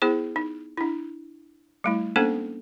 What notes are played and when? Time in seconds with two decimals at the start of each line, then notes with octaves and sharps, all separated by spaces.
0.02 B3 E4 G#4 C5
0.36 D#4
0.77 D4 E4
1.84 G3 A3 E4
2.16 A#3 B3 C#4 D4 A4 C5